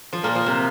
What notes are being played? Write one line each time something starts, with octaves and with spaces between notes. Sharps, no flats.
F3
A#2 A#3
F3
C3